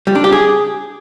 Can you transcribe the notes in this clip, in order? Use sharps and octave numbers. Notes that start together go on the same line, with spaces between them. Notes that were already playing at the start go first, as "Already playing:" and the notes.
G3
D4
G4
G#4